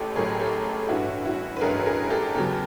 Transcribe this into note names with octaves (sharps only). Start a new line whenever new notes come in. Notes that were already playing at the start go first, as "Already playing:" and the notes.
Already playing: A1 A2 G4 A4
A1 A2 F#3 G#4 A#4
G4 A4
A1 G2 E3 E4 F#4
E4 F#4
B4
A1 G2 E3 G#4 A#4
G#4 A#4
G4 A4
E2 C#3 F#3 G4 A4